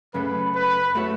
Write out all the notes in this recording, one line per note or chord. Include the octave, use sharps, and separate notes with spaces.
F#2 C#3 A3 B4
B4
A3 F#4 A4 C#5